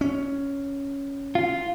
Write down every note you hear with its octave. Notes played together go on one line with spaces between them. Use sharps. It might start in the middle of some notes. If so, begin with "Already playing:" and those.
C#4
F4